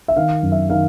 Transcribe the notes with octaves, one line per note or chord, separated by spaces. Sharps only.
E5
D#3 F5
F#2
E5
D#3 F5